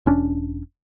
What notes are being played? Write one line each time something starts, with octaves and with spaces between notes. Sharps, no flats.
E1 C#4 D4